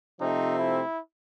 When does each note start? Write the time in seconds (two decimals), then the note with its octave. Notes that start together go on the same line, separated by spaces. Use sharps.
0.20 C3 F3 A3 C4 D#4
0.58 E4